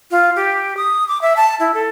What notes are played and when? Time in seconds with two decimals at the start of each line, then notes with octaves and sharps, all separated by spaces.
0.11 F4
0.36 G4
0.77 D#6
1.08 D6
1.22 E5
1.37 A5
1.60 E4
1.74 A4